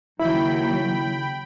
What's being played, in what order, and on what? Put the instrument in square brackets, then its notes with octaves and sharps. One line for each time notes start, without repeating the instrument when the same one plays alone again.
[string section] D#2 F#3 [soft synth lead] C#3 [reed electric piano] E4 [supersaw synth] G5 B5